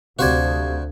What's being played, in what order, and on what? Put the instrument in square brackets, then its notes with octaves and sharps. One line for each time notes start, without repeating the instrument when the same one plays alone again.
[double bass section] D2 [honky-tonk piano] C3 [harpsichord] F#4 C5 D5 [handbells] F5 G#6